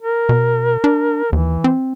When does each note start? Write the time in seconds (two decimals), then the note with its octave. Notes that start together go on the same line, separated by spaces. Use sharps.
0.02 A#4
0.29 B2
0.84 D4
1.32 D#2 E3
1.64 C4